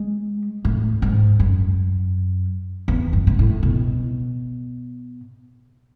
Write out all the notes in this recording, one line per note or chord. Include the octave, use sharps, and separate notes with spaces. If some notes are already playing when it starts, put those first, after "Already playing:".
Already playing: G#3
A2
G#2
F#2
E2
F#2
B2
A2
B2